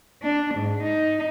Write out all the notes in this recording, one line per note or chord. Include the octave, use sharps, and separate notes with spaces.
D4
G#2
D#4